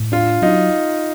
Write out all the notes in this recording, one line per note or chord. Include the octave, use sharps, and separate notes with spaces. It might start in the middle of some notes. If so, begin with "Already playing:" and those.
Already playing: A2
D4 F4
F#3 D#4